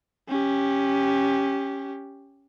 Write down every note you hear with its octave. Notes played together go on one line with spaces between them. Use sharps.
C#4 G4